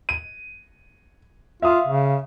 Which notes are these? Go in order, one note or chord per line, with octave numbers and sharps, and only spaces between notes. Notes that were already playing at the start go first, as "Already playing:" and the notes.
D#7
F4 E5 F5 D#6
C#3